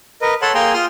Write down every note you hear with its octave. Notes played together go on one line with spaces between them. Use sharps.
A#4 B4 D#5
A4 C#5 F#5 A5 B5 C6
A#3 G#4 G5 G#5 A#5 C6
F4 C6 D#6 F6